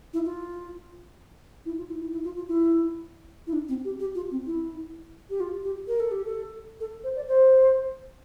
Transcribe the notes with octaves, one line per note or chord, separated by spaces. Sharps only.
E4
F4
E4
F4
E4
E4
E4
F4
F4
E4
E4
D4
C4
G4
G4
F4
C4
E4
G4
F4
G4
A#4
A4
G4
A4
A4
C5
D5
C5